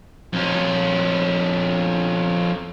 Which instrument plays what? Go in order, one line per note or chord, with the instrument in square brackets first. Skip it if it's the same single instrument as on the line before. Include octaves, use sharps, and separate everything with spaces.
[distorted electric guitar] F2 C#4